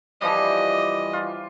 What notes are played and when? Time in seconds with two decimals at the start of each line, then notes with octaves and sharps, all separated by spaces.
0.21 E3 F3 G3 D#5
1.13 F4